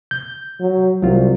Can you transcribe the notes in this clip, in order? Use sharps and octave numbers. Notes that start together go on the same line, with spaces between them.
G6
F#3
C2 F#3 F4